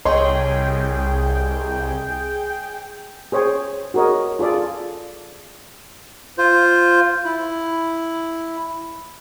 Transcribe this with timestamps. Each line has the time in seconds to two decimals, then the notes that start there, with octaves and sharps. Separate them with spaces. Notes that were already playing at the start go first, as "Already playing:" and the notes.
0.05 C2 G#4 C#5 D#5 G5 C6
3.32 G#4 C5 C#5 G5
3.94 F#4 G#4 A#4 C#5 D#5
4.39 F4 G#4 A4 D5
6.38 F4 C5
7.25 E4